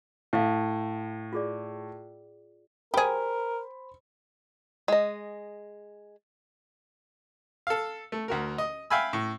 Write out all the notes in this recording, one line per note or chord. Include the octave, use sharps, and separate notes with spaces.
A2 E5 F5
F4 G#4 D5
G4 G#4 A#4 C5 B5
G#3 D#5
A4 F5
A3
D2 F#4 A#4
D#5
E5 F5 G5 G#5 B5 E6
A2